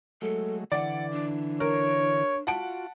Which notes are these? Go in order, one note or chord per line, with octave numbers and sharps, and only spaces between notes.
F#3 G#3 A3 A4
D3 E3 D5 F#5
D4
A#4 C#5
F4 F#4 F#5 A5 D7